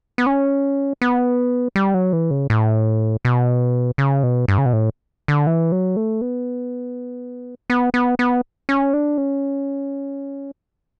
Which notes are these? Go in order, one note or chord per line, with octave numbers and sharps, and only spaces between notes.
B3
C#4
B3
G3
F#3
E3
C#3
A2
B2
C#3
B2
G2
C#3
B2
A2
D3
E3
F#3
A3
B3
B3
B3
B3
C#4
D4
C#4